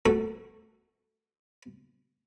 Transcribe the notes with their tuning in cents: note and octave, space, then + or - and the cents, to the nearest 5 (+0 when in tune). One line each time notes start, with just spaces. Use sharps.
A3 +0 F#4 +0 A4 +0